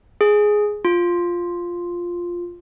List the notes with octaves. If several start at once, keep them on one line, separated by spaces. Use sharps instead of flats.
G#4
F4